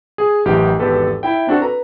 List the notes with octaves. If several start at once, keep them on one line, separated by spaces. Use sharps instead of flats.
G#4
A1 F#2 E3 G4 G5
G#1 E2 G4 A4 B4
E4 E5 G5
C4 D4 F#4 A4
B4 A#5